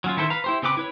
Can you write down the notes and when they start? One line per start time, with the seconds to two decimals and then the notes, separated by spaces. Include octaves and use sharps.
0.04 F#3 C#4 F4
0.17 D#3 E4 A4 C5
0.30 B4 F5 A#5
0.44 E4 G4 C5
0.62 C#3 C4 G4 B4 D6
0.77 E4 B4 C#5